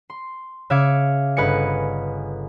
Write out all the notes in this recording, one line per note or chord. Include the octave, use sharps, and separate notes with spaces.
C6
C#3 E5 F5 D6 G#6 C#7
G1 B4 D#5 G#5 C#7